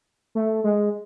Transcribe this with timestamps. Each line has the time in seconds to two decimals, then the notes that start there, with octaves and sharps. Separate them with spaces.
0.35 A3
0.64 G#3